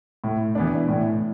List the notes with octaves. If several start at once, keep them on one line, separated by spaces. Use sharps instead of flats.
A2
E3 B3 D4
A2